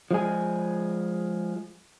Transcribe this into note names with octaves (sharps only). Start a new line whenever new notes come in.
F3 G#3 G#4